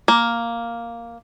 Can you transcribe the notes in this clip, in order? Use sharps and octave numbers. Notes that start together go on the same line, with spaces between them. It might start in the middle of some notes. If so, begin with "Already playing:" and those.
A#3